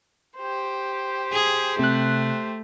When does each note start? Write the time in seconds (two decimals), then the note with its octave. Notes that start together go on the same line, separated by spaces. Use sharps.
0.38 G4 C5
1.32 G#4
1.79 C3 A3 F#6